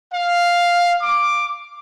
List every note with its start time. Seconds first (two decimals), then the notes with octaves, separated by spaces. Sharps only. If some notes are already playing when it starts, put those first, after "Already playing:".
0.13 F5
1.02 D6